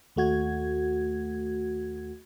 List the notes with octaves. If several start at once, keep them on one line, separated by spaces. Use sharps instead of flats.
D#2 A3 F#4 G#6